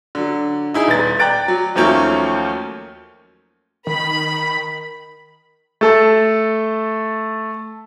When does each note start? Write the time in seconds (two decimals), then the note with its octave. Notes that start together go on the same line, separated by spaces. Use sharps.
0.15 D3 F#3
0.74 D#4 E4 G#4
0.88 D#1 B3 A6
1.19 D5 G5 A#5 F#6 A6 D7
1.48 F#3
1.76 D#2 F3 F#3 A3 A#3 C#4
3.87 D#3 A#4 B5
5.81 A3 A4